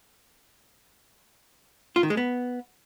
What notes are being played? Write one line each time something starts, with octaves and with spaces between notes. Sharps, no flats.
F4
D#3
G#3
B3